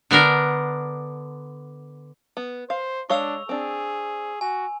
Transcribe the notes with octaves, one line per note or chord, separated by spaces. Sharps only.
D3 B3 D4 A#4
B3
C5 F5
G#3 D4 C#5 F5 C#6 E6 F7
C4 D4 G#4
F#4 G#5